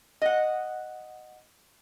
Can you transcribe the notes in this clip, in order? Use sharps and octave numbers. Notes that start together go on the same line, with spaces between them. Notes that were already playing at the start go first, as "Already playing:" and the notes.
D#5 F#5